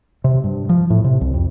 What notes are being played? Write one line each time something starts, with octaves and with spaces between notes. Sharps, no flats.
C3
G2
F3
A2
C3
C2
F2